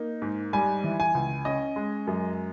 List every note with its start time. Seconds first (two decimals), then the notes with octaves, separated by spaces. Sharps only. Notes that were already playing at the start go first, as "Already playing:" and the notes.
Already playing: A#3 D#4
0.22 G#2
0.53 G3 G#5
0.84 E3
1.00 G#5
1.15 C#2
1.45 C#4 D#5
1.76 G#3
2.07 F#2